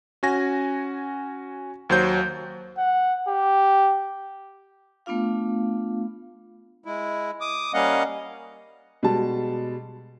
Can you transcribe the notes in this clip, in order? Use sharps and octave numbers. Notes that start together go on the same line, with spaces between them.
C#4 F#4 G#5 A#6
D#2 F#3 C5 G6
F#5
G4
A3 B3 D4 F4 F5
G#3 E4
D6 D#6
G3 A#3 C#4 D#5 F5 F#5
B2 G3 G#3 A5